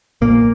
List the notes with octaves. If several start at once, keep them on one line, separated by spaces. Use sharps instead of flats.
A#1 A#2 A#3